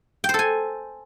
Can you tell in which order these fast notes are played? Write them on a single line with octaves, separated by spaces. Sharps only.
G5 C5 A4 G#5